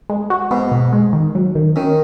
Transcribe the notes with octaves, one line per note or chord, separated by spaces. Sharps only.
G#3
F#4
G#2 B3
B2
G#3
D#3
F#3
D#3
D#3 C#4